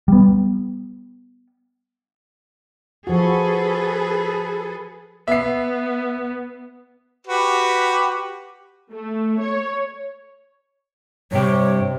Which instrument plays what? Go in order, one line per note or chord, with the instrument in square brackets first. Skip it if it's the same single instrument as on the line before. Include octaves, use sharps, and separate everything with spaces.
[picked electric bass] G3 B3
[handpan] F3 F#4 [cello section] G#4 A4 B4
[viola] B3 [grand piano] E5 C7
[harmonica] F#4 G4 B4
[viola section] A3
C#5
[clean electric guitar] G2 G4 [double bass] C3 [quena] C#5